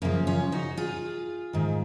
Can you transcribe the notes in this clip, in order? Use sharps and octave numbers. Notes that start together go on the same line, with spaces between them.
F#2 C#3 F3 A#3 C#4
C#4 F4
D#4 F#4
F4 G#4
G#2 D#3